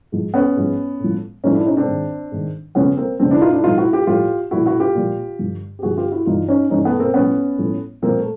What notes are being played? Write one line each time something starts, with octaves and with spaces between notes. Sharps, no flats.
G#2 F3
B3 C#4
G#2 F3
A2 F3
A2 F3 C#4 D#4
D4 E4
C#4 D#4
C4 D4
G#2 D#3
G#2 D#3
F2 C#3 F3 B3 C#4
A#3 C4
F2 C#3 F3 C4 D4
D4 E4
D#4 F4
D4 E4
A2 F3 D#4 F4
E4 F#4
F4 G4
A2 F3 F4 G4
A#2 F3 E4 F#4
E4 F#4
F4 G4
A#2 F3
G2 D3 F3
G4
G2 D3 F3 F#4 G#4
F4 G4
E4 F#4
G2 E3 D#4 F4
C#4 D#4
G2 E3 C#4 D#4
A3 B3
A#3 C4
A2 F3 B3 C#4
A2 F3
A#2 F3 A#3 C4
A3